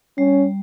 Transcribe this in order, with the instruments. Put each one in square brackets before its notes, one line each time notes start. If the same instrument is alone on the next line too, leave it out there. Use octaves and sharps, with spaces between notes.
[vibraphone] G3 [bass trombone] C#4